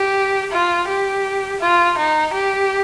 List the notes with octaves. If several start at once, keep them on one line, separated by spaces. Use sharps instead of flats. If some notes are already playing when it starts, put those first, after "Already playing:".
Already playing: G4
F4
G4
F4
D#4
G4